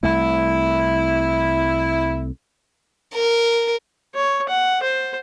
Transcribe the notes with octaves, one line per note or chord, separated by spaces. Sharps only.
C2 A3 E4
A#4
C#5
F#5
C5